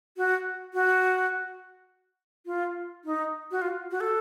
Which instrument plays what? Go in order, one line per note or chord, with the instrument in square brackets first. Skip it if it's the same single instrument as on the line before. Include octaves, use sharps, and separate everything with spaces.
[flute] F#4
F#4
F4
D#4
F#4
F4
F#4
A4